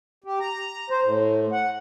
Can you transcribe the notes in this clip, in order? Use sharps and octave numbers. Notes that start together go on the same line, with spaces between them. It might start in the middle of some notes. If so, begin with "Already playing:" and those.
G4
A#5
C5
A2
F#5